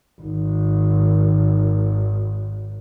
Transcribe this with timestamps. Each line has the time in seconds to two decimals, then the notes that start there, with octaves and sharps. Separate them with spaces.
0.21 G#1 D#3